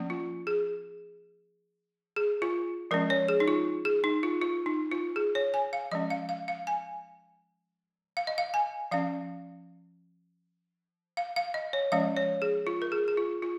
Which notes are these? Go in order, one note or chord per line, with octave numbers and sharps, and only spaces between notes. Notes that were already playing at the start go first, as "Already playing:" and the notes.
Already playing: F3 A#3 C#4
F4
G#4
G#4
F4
F3 G#3 C#4 A#4
C#5
G#4
D#4
F4
G#4
D#4
F4
F4
D#4
F4
G#4
C#5
G#5
F5
F3 G#3 C#4 D#5
F5
F5
F5
G#5
F5
D#5
F5
G#5
F3 C#4 F5
F5
F5
D#5
C#5
F3 G#3 C#4 F5
C#5
G#4
F4
A#4
G#4
G#4
F4
F4